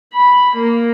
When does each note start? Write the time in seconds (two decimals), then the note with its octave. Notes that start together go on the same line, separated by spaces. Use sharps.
0.13 B5
0.55 A#3